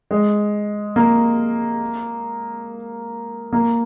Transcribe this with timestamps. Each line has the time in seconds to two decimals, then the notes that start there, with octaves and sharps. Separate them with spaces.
0.11 G#3
0.96 A#3
3.53 A#3